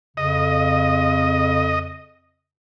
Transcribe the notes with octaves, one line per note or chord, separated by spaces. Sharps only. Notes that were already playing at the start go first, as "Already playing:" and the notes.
F2 C#3 D#5